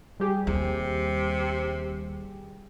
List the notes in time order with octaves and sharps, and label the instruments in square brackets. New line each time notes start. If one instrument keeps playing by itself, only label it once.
[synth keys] G3 G4 G#4
[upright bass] D#2 [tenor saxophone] C3